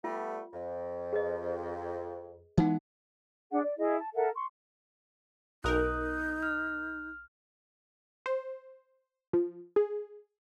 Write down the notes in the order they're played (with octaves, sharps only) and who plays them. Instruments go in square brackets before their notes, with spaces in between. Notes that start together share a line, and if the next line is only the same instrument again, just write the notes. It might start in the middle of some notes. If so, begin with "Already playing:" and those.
[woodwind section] G3 A3 B3 [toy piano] F4
[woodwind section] F2
[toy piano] G#4 B4 D#5
[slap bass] E3 G#3 B3 [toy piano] D#4 F#5
[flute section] D4 G#4 F#5
D5
E4 G#4 D#5
A5
A4 A#4 E5 F#5
C6 C#6
[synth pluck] B1 A#4 [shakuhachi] D#4 [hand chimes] D#6 F#6
[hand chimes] F6
[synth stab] C5
F3
G#4